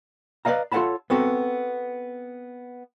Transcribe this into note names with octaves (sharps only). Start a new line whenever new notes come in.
B4 D5 D#5 F5 A#5
F4 A4 C#5 F#5 A5 B5
B3 C4 F#4 A4